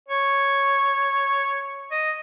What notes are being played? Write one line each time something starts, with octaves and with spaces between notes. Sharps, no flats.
C#5
D#5